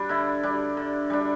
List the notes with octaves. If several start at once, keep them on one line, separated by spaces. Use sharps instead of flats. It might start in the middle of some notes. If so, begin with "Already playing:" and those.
Already playing: G3 D4
D3 E4
G3 D4
D3
G3 D4